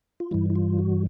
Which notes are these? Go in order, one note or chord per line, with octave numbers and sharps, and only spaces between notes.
F4
G2 E3 G3 E4
E4
F4
F#4